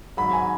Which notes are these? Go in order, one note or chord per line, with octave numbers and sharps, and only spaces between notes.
G#1 G#2 F#3 B5
G#5